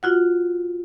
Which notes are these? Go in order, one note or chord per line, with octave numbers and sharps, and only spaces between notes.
F4 F#4 F#5